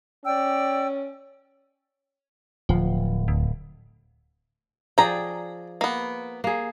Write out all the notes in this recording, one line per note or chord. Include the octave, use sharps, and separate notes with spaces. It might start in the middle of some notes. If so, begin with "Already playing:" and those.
C#4 D5 G5 E6
D1 F3
D2
F3 G#4 D5 G5 A#5
A#3 B3
A#3 G#4